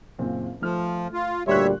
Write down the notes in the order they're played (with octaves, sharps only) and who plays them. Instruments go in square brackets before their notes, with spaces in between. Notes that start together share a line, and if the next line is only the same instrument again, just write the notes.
[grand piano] F#1 A#2 C4
[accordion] F3 [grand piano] A3 F6
[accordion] F4
[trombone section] D2 A#2 G3 [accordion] C#5 E5 [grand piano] C6 C#6 F#6